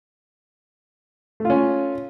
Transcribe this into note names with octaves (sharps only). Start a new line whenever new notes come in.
A3 C#4 F4